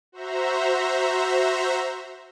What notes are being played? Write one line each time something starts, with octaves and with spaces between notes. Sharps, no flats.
F#4 C5 E5 A#5